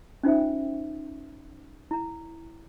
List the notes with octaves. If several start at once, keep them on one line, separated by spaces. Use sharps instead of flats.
C#4 D#4 F4 C5 E5 G5
E4 A#5